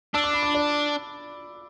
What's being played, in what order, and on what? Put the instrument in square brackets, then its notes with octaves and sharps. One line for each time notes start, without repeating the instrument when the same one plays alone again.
[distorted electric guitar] D4 [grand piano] E6
[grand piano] D6
B5
D6
D5